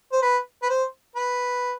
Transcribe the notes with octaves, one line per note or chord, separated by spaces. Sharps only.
C5
B4
B4
C5
B4